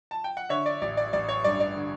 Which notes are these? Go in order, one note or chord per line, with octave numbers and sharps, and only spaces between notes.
A5
G5
F#5
D3 C#5 E5
D5
A1 D5
D5
A1 D5
C#5
G2 D5
D5
D3